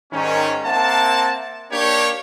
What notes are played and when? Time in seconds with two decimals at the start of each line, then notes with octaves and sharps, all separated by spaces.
0.13 G#2 D#3 G3 C#4
0.66 A#3 C4 E5 F#5 A5
1.72 A#3 D4 G4 C#5